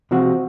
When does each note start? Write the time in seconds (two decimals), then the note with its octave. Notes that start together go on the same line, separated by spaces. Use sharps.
0.11 C3 F3 G#3 C4 F#4